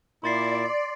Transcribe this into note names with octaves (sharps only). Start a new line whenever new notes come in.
A#2 E4 D5 C6 A6 C7